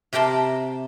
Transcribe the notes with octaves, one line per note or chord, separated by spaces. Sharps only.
C3 G4 A#4 G5 A5 C6